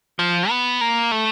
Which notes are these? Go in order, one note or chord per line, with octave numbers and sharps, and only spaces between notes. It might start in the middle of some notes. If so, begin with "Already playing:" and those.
F3
B3
A#3
A3